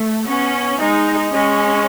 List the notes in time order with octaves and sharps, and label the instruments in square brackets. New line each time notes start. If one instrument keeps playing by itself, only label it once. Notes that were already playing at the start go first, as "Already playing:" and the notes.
Already playing: [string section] A3
[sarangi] B3 [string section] C#4
[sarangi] G#3 [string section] D#4
[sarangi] G#3 [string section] C#4